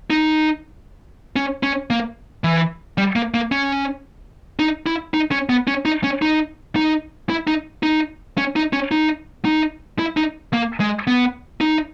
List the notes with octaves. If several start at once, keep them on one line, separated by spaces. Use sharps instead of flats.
D#4
C#4
C#4
A#3
E3
G3
A#3
A#3
C#4
D#4
E4
D#4
C#4
B3
C#4
D#4
C#4
D#4
D#4
E4
D#4
D#4
C#4
D#4
C#4
D#4
D#4
E4
D#4
A#3
G#3
B3
D#4